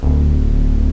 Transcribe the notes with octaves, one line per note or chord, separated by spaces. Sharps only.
D1